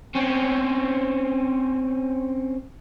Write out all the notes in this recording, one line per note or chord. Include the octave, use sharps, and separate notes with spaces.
C4 C#4